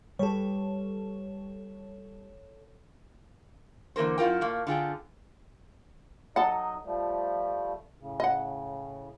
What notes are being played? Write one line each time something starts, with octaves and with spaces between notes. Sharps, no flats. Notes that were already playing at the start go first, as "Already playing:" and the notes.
G3 A4 B4 C#5
D3 E3 A#3 A#4 C5
F#2 E4 F4 A#4 G5
A#2 A3 A#3
D3 F4 G#4 G5
F#3 D#4 A4 D#5 F#5
F3 G3 A3
A2 C#3
D#5 F#5